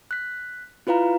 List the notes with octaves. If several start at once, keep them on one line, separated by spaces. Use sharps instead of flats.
F#6 B6
E4 F4 B4 F5 A#5